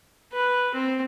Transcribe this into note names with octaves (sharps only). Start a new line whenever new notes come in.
B4
C4